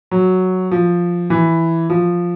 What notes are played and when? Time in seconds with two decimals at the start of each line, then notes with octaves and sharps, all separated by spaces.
0.11 F#3
0.71 F3
1.30 E3
1.90 F3